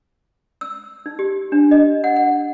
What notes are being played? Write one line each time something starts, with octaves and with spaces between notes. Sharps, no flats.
E6
D#4
G4
D4
D#5
F#5
F#5